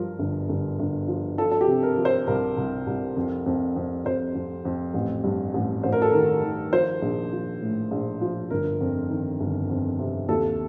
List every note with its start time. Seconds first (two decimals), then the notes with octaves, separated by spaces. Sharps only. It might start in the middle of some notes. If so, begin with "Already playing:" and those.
Already playing: G2 F3 A#4
0.19 G1
0.49 G1
0.79 G1
1.08 F3
1.38 F3 A4
1.51 A4
1.61 G4
1.67 C3
1.83 A#4
1.98 F3
2.05 C5
2.27 C2 A#4
2.57 C2
2.86 C2
3.17 F2
3.46 F2
3.76 F2
4.05 F2 C5
4.35 F2
4.65 F2
4.94 A1
5.24 G2
5.54 A1
5.83 A1 C5
5.92 A#4
6.02 A4
6.11 D#3 A#4
6.43 D#3
6.72 F3 C5
7.02 A#1
7.32 F3
7.61 A2
7.91 A#1
8.21 F3
8.50 G1 A#4
8.81 F2
9.10 D#3
9.40 G1
9.69 F2
9.99 C3
10.28 D#2 A4